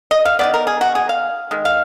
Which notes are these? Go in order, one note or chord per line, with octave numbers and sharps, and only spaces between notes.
D#5
F5
D#3 G#3 B3 D5
A#4
G#4
F#4
G#4
F5
D#3 G#3
F5